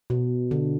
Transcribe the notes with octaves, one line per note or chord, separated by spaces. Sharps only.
B2
D3